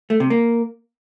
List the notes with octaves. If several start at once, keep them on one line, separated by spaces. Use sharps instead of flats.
A3
C3
A#3